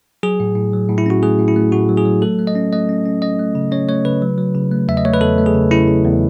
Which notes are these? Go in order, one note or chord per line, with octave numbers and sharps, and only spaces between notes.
F#3 G#4
A2
A2
F#3
A2
E4
C#4 F#4
A3 G#4
A2
E4
A3
A2 F#4
F#3
G#4
F#3
A3 A4
A3
D#5
C#4
A3 D#5
C#4
C#4
C#4 D#5
A3
C#3
C#4 C#5
A3 C#5
C#3 B4
F#3
F#3
C#3
A3
E2 E5
D#5
A3 C#5
B4
E2 A4
A3
G#4
C#3
C#3 E4
C#3
E2